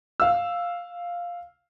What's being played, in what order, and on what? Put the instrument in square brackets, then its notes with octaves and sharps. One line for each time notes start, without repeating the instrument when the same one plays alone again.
[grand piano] F5 E6